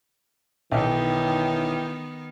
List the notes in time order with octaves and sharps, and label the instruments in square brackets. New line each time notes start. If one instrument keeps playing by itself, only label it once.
[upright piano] B1 [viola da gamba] D#3 B3 [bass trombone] E3 [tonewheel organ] G5